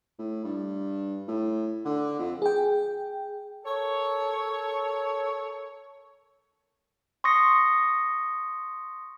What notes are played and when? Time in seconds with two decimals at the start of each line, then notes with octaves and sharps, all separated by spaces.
0.19 A2
0.44 G2
1.28 A2
1.85 D3
2.19 F2
2.42 G#4 G5
3.65 A4 A#4 C#5
7.24 C6 C#6 D#6 A#6 C#7